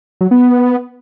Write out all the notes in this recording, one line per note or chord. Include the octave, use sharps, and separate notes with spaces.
F#3
B3
B3